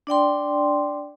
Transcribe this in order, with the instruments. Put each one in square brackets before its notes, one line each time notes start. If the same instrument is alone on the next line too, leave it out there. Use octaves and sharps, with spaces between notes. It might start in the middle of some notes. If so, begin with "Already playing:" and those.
[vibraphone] D4 D5 G5 C6